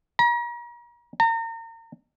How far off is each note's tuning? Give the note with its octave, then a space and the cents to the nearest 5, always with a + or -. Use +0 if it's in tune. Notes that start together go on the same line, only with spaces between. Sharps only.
A#5 +40
A#5 -35